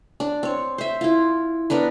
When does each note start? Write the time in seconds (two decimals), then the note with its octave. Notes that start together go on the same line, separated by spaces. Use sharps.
0.20 D4
0.43 C4 C#5
0.78 C5 E5
1.01 E4 F4
1.70 B3 D4 A#4 B4